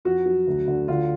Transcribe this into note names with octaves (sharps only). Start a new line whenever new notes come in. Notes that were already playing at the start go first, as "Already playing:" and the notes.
F2 F#4
F#3
D2
D3
D3 F4